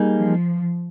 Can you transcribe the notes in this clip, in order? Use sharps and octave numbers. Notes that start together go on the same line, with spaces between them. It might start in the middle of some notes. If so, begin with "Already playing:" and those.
Already playing: G3 A#3 D#4 G#4
F3